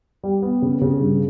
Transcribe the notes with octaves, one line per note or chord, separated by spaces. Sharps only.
G3
B3
C#3
C#3
G2